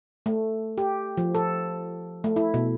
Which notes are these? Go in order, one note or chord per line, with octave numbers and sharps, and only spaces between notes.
A3
G4
F3
A4
A3
E4
B2